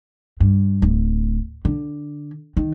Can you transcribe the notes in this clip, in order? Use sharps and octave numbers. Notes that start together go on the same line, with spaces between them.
G2
D1
D3
D#3